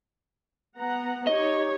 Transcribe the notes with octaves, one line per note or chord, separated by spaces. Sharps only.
B3 F#5 A#5
D#4 G4 C#5 D#5